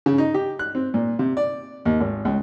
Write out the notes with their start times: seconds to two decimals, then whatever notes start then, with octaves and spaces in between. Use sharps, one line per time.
0.06 C#3
0.18 D#4
0.34 G4
0.59 F#6
0.75 C4
0.94 A#2
1.19 C3
1.37 D5
1.85 D#2
2.01 G#1
2.25 C#2